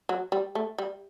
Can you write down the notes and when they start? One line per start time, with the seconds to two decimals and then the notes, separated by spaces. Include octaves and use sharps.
0.09 F#3
0.32 G3
0.55 A3
0.78 G3